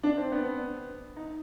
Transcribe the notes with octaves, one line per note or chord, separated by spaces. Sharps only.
D4
C4
B3
D#4